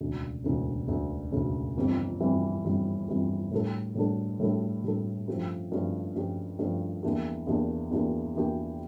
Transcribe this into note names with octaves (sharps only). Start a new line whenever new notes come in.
E1 D2 C#3
E1 D2 C#3
E1 D2 C#3
E1 D2 C#3
G1 F2 E3 G3
G1 F2 E3 G3
G1 F2 E3 G3
G1 F2 E3 G3
A2 G3 D4 A4
A2 G3 D4 A4
A2 G3 D4 A4
A2 G3 D4 A4
G2 F3 A3 C#4 G4
G2 F3 A3 C#4 G4
G2 F3 A3 C#4 G4
G2 F3 A3 C#4 G4
E2 E3 A#3 D4 G4
E2 E3 A#3 D4 G4
E2 E3 A#3 D4 G4
E2 E3 A#3 D4 G4